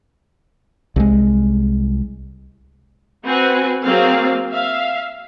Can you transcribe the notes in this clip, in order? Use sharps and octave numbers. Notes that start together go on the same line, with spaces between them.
C2 G#3
C4 F#4 B4 G#5
F#3 A#3 C4 G#4 F5
E5 F5